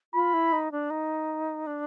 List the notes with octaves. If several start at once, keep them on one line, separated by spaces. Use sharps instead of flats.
F4 B5
E4
D#4
D4
D#4
D4